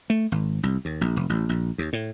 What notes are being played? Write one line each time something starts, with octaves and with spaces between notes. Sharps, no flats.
A3
G#1
C2
D#2
A#1
F1
A1
A#1
D#2
A2